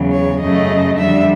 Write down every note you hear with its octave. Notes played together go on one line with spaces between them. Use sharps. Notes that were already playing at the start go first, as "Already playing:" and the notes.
Already playing: E2 C#3 F#3
C#5
F#2 C#3 F#3 A3 D#5
F2 D3 G3 E5